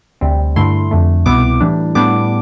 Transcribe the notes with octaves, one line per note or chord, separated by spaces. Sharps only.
D2 C3 G3 C4
G2 D3 A3 E4 C6
F2 D3 A3
C2 B2 B3 E4 D6
A2 E3 G3 D4
A2 G3 B3 D4 D6